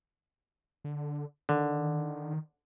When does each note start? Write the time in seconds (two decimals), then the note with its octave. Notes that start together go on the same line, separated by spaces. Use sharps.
0.84 D3
1.49 D3 D#3